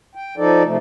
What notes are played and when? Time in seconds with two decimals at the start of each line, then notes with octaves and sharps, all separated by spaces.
0.15 G5
0.37 F3 D#4 A4 D5
0.65 C3 F3 A3